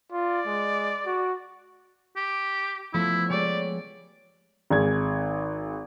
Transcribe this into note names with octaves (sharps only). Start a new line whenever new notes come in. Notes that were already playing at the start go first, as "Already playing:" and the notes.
F4 D5
G#3
F#4
G4
F3 A3 B3 E4
G#3 G4 C#5 D5
G#1 G#4 G#6